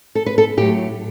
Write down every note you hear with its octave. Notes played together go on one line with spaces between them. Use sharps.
A4
B4
A4
A2 F#3 G4